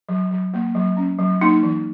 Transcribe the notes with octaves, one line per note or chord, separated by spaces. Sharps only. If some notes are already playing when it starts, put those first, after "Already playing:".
F#3
F#3
A#3
F#3
C#4
F#3
A#3 D#4
E3